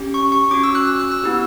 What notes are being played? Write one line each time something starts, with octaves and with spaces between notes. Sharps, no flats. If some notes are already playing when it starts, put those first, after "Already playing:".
Already playing: C#4 G4
C#6
C#6
C#4 F#4 D6
E6
F#6
E6
F#6
E6
B3 E4 G4